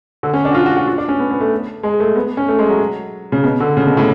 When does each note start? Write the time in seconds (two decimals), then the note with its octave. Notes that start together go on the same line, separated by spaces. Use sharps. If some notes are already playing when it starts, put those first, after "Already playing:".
0.23 D3
0.33 C#4
0.45 D4
0.51 F#4
0.55 F4
0.66 F#4
0.76 F#4
0.88 F4
0.98 D4
1.08 C#4
1.19 B3
1.31 B3
1.41 A3
1.83 G#3
2.00 A3
2.16 B3
2.37 C#4
2.48 A3
2.59 G#3
2.69 F#3
3.32 C#3
3.44 B2
3.60 D3
3.77 C#3
3.86 B2
3.97 A2